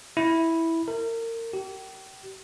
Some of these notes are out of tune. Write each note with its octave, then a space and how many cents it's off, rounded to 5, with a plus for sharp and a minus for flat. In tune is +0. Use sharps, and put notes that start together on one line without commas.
E4 -5
A#4 -30
G4 -35